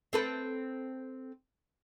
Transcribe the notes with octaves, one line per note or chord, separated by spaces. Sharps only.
C4 A4 B4